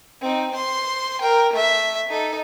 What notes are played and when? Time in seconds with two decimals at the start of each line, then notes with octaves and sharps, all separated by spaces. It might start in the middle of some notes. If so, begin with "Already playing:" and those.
0.21 C4 D#4
0.51 C5 C6
1.21 A#4 G5
1.53 A3 E5
2.08 D#4 A4